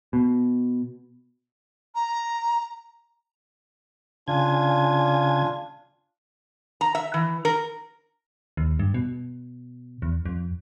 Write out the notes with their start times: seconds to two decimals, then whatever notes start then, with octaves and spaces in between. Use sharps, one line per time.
0.13 B2
1.95 A#5
4.28 C#3 D4 F4 G#5 G#6
6.81 A#5
6.95 E5
7.14 E3
7.45 A#4
8.57 D#2
8.79 G2
8.94 B2
10.02 E2
10.26 F2